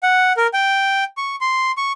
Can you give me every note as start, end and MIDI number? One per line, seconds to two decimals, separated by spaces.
0.03 0.33 78
0.37 0.47 70
0.54 1.04 79
1.17 1.36 85
1.41 1.72 84
1.77 1.92 85